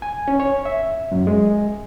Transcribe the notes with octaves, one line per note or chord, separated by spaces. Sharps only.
G#5
C#4
C#5
E5
F#2
G#3